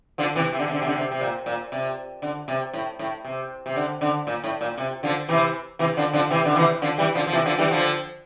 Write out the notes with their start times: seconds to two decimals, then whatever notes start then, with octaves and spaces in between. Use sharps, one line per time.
0.18 D3 F3
0.35 C3 E3
0.53 C3
0.59 D3
0.67 C3
0.73 D3
0.81 C3
0.88 D3
0.96 C3
1.11 C3
1.21 A#2
1.46 A#2
1.72 C3
2.22 D3
2.48 C3
2.73 A2
2.99 A2
3.24 C3
3.66 C3
3.76 D3
4.01 D3
4.27 A#2
4.44 A2
4.61 A#2
4.78 C3
5.03 D3 F3
5.29 C3 E3
5.79 C3 E3
5.97 D3 F3
6.13 D3 F3
6.30 C3 E3
6.45 D3
6.56 C3 E3
6.82 D3 F3
6.98 E3 G3
7.15 D3 F3
7.27 F3
7.33 C3 E3
7.45 D3 F3
7.58 E3 G3
7.71 D3 F3